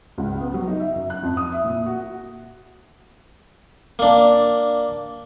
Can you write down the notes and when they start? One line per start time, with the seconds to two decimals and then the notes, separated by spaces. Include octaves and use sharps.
0.18 C#2
0.41 B3
0.54 F#3
0.67 D#4
0.80 E5
0.96 F#2
1.10 F#6
1.23 F2
1.37 D#6
1.52 E5
1.64 A#2
1.86 F#4
3.99 A#3 D4